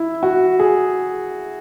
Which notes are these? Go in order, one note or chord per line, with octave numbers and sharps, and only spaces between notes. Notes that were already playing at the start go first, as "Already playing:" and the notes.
Already playing: E4
F#4
G#4